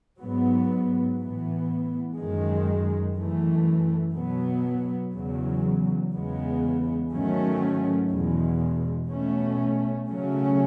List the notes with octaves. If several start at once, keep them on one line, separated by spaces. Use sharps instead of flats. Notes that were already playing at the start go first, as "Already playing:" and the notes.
G#2 F#3 B3
A2 E3 B3
F#2 D#3 G#3
F#2 E3 A3
B2 F#3 B3
E2 C#3 F#3
E2 C#3 G#3 B3
G#2 D#3 F#3 A3 C#4
E2 B2 G#3
B2 A3 C#4
C#3 F#3 A3 C#4